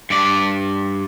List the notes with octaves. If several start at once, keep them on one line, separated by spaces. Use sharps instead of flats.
G2 D5